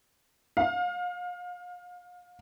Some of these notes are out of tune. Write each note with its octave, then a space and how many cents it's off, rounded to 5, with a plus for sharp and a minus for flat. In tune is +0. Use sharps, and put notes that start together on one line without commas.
F5 +35